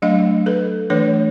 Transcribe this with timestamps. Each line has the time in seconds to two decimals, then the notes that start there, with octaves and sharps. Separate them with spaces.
0.02 F#3 A3 D4 D#5 F5
0.46 A4 B4
0.90 E3 A3 D4 B4 C#5